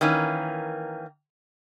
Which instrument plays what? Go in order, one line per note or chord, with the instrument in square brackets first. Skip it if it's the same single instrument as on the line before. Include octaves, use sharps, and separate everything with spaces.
[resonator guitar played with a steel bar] D#3 E3 A#3 C#4